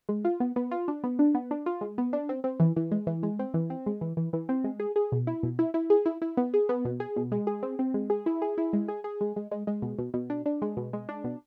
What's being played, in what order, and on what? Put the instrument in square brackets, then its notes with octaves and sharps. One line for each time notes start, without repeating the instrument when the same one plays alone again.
[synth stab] G#3
F4
B3
B3
F4
D4
B3
D4
B3
D4
F4
G#3
B3
D4
C4
C4
E3
E3
G#3
E3
G#3
C4
E3
C4
G#3
E3
E3
E3
C4
G#3
G#4
G#4
B2
E4
B2
E4
E4
G#4
E4
E4
B3
G#4
B3
B2
G#4
B2
G#3
G#4
C4
C4
G#3
G#4
E4
G#4
E4
G#3
G#4
G#4
G#3
G#3
G#3
G#3
B2
B2
B2
D4
D4
G#3
B2
G#3
D4
B2